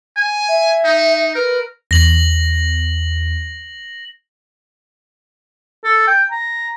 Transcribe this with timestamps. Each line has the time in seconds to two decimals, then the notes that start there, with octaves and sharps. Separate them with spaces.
0.17 G#5
0.48 E5
0.85 D#4
1.35 A#4 B4
1.91 E2 A#6 F#7
5.84 A4
6.07 G5
6.32 A#5